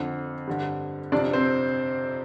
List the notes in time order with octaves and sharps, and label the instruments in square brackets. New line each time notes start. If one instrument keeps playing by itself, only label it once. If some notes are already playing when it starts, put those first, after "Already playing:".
Already playing: [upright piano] F2 D3
G2 D3
F2 C3 D4 D5
C4 C5